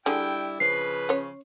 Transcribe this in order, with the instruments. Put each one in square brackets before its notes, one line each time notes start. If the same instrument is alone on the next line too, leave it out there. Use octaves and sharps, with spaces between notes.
[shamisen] D3 G#4 [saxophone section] G3 E4 [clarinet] G5
[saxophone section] C#3 F3 [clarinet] B4 [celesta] C7
[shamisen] C#4 C#5